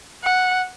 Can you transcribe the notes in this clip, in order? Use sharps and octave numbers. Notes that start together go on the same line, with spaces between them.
F#5